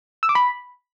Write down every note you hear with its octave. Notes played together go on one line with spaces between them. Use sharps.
E6
D6
B5